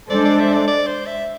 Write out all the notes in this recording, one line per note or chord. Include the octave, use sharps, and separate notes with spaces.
G#3 D4 A4 C5 D5
D5
E5
D5
D5
C5
E5